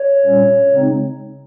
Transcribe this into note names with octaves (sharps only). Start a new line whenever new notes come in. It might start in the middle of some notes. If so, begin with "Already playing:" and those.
Already playing: C#5
A#2 G3 C#4
C#3 G#3 C4 D#4